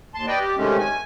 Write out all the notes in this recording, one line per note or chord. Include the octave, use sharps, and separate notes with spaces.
D#2 A5 C6
B4 D5 D#5 G5
G4
C3 D#3 G#3 A3 C#4
G#5